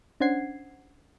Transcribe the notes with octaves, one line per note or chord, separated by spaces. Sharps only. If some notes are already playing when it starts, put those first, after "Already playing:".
C#4 D4 C5 F#5 G#6 C7